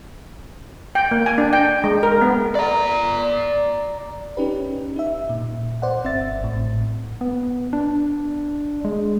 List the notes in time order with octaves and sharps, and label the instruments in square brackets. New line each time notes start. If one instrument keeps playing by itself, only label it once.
[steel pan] G5
A#3
G#5
D4
G5
G#3
A#4
B3
[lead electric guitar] D5 A#5
[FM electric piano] C#4 D#4 G4 B4
D#4 E5
A#2
C5 D5 F#5
G1 C4 E5 A6
A1 A2
[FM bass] B3
D4
G#3